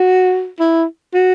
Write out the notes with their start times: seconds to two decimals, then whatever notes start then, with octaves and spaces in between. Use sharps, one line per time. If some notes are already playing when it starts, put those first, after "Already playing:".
Already playing: F#4
0.59 E4
1.14 F#4